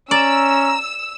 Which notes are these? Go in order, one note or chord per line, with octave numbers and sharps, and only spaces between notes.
C#4 D5 A#5 E6